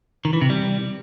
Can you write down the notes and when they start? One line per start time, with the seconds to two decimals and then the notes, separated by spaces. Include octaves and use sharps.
0.25 D#3
0.33 E3
0.41 C3
0.50 G3